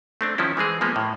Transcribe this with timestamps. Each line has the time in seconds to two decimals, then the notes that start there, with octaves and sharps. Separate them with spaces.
0.21 A3 C4 D4
0.38 D#3 F3 C#4 E4
0.57 E3 G#3 C4 G#4
0.81 F3 G#3 A#3 B3
0.96 A2